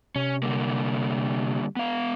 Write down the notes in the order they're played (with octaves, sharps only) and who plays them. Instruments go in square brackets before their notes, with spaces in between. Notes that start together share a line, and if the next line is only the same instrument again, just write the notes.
[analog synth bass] C3 [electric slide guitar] C#4
[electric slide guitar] D3 G3 A#3
B3 F5